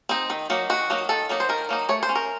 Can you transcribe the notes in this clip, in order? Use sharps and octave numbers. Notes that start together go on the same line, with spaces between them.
C4 D#4
D#3
F#3 A#3 D#4
D#3 F#4
F#3 A#3 D#4
D#3 A4
F#3 A#3 D#4
C5
D#3 A#4
F#3 A#3 D#4
A3 C#5
C5
C#4
A#4